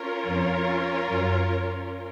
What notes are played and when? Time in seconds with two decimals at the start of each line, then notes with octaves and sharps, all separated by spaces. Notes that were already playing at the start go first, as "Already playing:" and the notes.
Already playing: C#4 F4 A#4 C#5
0.25 F2
1.08 F#2